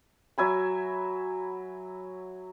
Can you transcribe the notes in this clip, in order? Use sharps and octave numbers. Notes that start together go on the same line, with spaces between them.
F#3 E5 G#5 B5